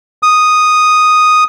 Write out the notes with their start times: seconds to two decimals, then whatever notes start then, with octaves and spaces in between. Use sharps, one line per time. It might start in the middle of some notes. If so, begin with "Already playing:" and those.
0.23 D#6